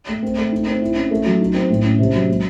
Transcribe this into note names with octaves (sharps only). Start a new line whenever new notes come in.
A3
C4
A3
D#4
C4
E4
C#4
A3
F#3
D#4
C4
A2
C#4
C3
F#3
G#3